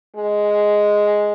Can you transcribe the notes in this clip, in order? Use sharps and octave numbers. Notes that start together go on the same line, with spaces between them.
G#3